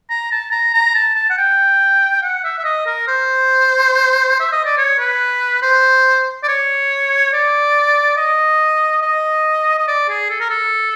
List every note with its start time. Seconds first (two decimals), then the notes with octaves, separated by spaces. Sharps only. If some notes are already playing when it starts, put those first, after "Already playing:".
0.10 A#5
0.32 A5
0.52 A#5
0.74 A#5
0.95 A5
1.15 A5
1.30 F#5
1.38 G5
2.22 F#5
2.44 E5
2.59 E5
2.64 D#5
2.86 A#4
3.08 C5
4.40 E5
4.52 D#5
4.65 D5
4.77 C#5
4.99 B4
5.62 C5
6.44 D5
6.48 C#5
7.33 D5
8.17 D#5
9.02 D#5
9.79 D#5
9.88 D5
10.09 G#4
10.30 A4
10.40 A#4
10.50 A4